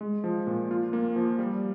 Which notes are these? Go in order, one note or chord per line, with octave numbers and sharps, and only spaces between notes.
G#3
F3
A#2
F4
A#3
F3
G3